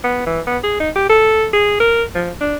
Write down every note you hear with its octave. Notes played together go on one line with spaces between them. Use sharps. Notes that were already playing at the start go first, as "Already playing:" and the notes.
B3
E3
B3
G#4
D#4
G4
A4
G#4
A#4
F3
D4